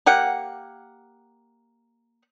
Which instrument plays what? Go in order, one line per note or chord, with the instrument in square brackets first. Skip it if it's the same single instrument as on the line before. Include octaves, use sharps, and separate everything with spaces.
[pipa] A#3 G4 F#5